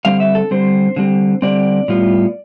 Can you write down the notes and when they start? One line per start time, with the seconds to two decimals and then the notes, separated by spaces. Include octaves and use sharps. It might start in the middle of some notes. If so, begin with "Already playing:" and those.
0.05 D3 G3 C4 F5
0.20 E5
0.35 A4
0.51 D3 G3 C4 C5
0.96 D3 G3 C4
1.42 D3 G3 C4 D5
1.88 A2 G3 B3 F4